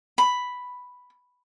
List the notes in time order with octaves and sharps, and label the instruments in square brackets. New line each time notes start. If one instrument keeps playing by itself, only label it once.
[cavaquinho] B5